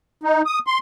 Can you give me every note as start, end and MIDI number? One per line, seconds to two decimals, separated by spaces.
0.23 0.42 63
0.46 0.59 87
0.67 0.79 84